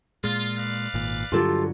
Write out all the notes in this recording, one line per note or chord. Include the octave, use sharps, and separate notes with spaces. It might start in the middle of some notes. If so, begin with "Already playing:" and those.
A#2 G#3 F4
B4 D5 F5
G#1 A#2
G2 D3 F#3 F4 G4 A4